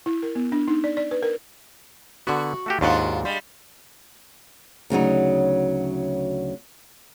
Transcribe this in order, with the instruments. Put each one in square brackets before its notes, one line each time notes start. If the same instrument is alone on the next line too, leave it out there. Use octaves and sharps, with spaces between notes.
[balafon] E4
A#4
B3
D4
D#4
D5
D5
B4
A#4
[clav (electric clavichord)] D3 B3 [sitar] F#4
[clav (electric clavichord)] A3 F#4 G4
[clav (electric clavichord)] D#2 G#2 F#5 [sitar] D4 F4 F#4
[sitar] G3 G#3
[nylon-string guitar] D2 C#3 F#3 D#4